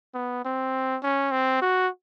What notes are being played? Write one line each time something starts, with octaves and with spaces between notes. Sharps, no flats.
B3
C4
C#4
C4
F#4